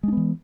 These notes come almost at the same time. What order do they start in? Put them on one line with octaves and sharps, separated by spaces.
G#3 D4 B3 E3